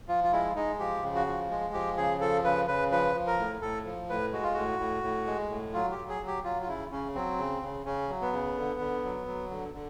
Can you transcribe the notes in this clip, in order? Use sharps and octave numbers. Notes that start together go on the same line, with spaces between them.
F3 F4
F4
G#3 E4
G#3 D#4
F3 G4
C#3
F#4
F3
G#3
F3 G4
C#3 G#4
F3 A4
C#3 B4
C#3 B4
F3 B4
F3
A#4
A2
A2 A4
F3
A2 B4
G#3 F#4
F4
A2 F#4
A2
A2
G#3
A2
F#3 F4
G4
F#3
G#4
F#3
G4
F#3 F4
F4
C#3 E4
C#3 C#4
F#3 C4
C#3
C#3
C#3 C#4
F#3
B3
C#3
D3
D3
F#3
F#3
D3
D3